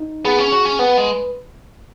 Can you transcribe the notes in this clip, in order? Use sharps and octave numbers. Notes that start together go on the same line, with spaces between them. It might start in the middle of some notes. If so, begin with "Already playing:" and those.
Already playing: D#4
B3 G#4
C#4
F#4
C#4
B3 B4
G#3